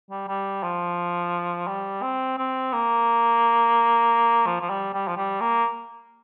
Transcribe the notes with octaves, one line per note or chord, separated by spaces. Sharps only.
G3
G3
F3
G3
C4
C4
A#3
F3
F3
G3
G3
F3
G3
A#3